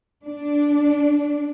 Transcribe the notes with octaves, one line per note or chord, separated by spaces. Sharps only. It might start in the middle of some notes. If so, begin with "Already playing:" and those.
D4